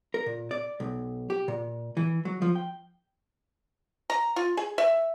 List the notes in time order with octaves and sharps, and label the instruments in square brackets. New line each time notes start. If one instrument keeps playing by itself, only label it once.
[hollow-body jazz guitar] A#4
A#2
D5
B1
G4
A#2
E3
F#3
F3
G5
[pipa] A#5
F4
G#4
E5